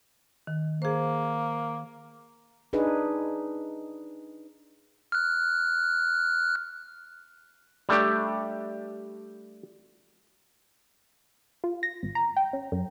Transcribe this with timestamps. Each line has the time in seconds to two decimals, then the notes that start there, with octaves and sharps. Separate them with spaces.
0.47 D#3
0.82 A#3 G#4 C5
2.73 D4 D#4 G#4 B4
5.12 F6 F#6
7.89 G3 A3 D4 G4
11.64 F4
11.83 A#6
12.03 G#1
12.15 A#5
12.37 G5
12.53 C#4
12.72 F#2